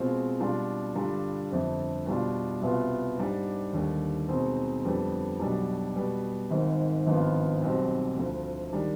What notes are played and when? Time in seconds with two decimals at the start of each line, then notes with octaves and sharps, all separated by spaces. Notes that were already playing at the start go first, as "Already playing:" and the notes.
Already playing: B2 G#3 C4 F4
0.40 B2 G3 D4 F4
0.95 G2 D3 G3 D4 F4
1.51 G1 F2 D3
2.06 B2 G3 D4 F4
2.61 C2 B2 B3 F4
3.17 G#2 G3 D4
3.73 D#2 D3 G3
4.28 B2 G#3 C4 D#4
4.84 F2 D3 G3 B3
5.40 B1 B2 G3 D4
5.96 B2 G3 B3
6.51 G#1 G#2 D#3
7.07 G#1 G2 F3 B3 F4
7.62 B1 B2 G3 C4
8.17 D2 D3 F3
8.73 D#3 G3 D4